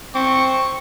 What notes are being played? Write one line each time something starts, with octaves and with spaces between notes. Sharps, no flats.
C4 C#6